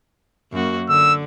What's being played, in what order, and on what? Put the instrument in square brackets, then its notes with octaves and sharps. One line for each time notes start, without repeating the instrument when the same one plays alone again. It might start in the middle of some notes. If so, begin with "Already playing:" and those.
[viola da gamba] F#2 A#3 F#4
[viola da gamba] D3 [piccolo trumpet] E6